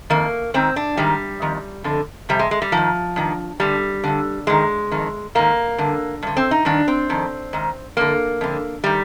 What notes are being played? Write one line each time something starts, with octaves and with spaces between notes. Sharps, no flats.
F2 D#3 A#3
G#2 D#3 C4
D4
G#2 D#3 G3
F2 D#3
F2 D3
F2 C3 G3
G#3
G#3
G3
G#2 D#3 F3
G2 D#3
G2 D3 G3
G2 D3
G#2 D#3 G#3
F2 D#3
G#2 D#3 A#3
G2 D3
G2 D3
C4
D#4
G2 D#3 D4
C4
F2 D#3
G#2 D#3
F2 D3 A#3
F2 D3
D#3 G3